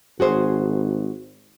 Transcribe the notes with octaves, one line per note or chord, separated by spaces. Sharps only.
G#1 F#4 G#4 C5